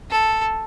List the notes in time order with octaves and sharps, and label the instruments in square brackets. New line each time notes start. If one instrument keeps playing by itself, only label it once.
[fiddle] A4